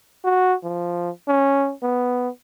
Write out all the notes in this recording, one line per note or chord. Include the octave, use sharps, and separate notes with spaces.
F#4
F3
C#4
B3